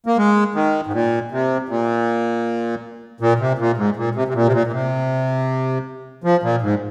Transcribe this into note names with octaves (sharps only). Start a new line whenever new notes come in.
A#3
G#3
D#3
G#2
A#2
C3
A#2
A#2
C3
A#2
G#2
A#2
C3
C3
A#2
C3
A#2
A#2
C3
F3
A#2
G#2